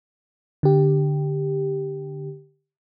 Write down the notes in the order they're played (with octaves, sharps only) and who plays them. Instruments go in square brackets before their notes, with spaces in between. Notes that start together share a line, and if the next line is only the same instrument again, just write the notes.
[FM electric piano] D3 G4